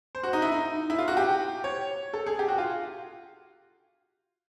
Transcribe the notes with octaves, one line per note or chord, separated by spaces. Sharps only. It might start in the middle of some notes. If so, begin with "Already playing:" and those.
C5
F#4
D#4
E4
D#4
E4
F4
F#4
G4
C#5
A4
G#4
G4
F#4
F4